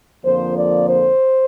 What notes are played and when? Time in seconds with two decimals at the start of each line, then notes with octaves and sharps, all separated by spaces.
0.24 F2 D3 F3 A#3 C5
0.56 D5
0.88 C5